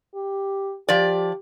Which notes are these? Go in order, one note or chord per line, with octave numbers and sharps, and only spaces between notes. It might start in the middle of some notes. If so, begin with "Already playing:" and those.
G4
F3 G4 D5